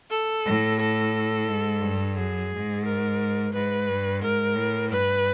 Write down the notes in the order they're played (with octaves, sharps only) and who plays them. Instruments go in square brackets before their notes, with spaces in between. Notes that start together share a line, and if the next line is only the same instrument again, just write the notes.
[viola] A4
[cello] A2
[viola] A4
[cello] G#2
G2
[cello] F#2 [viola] G#4
[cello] G#2
[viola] A#4
[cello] G#2 [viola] B4
[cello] G2
[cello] G#2 [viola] A#4
[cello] A2
[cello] G2 [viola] B4